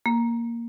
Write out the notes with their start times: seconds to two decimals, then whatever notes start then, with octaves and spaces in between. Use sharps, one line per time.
0.06 A#3